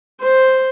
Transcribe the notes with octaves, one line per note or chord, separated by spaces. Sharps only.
C5